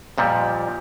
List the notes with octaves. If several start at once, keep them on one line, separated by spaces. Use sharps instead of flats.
F2 A#2 F3 G3